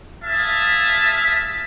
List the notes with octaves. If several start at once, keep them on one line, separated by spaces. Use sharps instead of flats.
G#4 E5 F5 A5